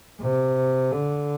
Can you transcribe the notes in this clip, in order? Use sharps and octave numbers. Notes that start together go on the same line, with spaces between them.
C3
D3